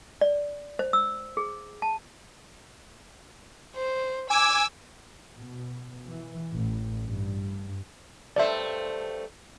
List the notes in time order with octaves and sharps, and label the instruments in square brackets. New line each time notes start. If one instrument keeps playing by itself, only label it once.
[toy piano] D5
C5
E6
G#4
A5
[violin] C5
[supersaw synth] G#5 D6 G#6 [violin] E6
[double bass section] B2
E3
A1
G2
[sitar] G2 A3 C5 [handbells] D5 E5